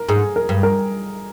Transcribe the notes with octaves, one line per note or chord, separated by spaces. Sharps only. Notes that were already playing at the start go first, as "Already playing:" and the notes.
Already playing: A#4
G#2 G#4
A#4
G2
A#4